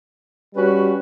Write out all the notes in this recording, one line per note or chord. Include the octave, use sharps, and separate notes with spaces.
G3 C#4 F#4 B4